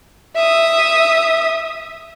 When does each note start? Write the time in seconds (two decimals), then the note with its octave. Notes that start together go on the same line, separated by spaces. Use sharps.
0.36 E5 D#6